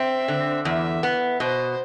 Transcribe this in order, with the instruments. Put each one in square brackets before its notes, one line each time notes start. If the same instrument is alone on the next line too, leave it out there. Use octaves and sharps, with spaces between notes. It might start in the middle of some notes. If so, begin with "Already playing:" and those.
Already playing: [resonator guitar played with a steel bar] C4 [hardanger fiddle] E5
[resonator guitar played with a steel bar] D3
[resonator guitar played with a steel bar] E2 [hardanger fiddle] E5
[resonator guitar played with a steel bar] B3
[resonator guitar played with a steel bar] B2 [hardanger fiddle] C5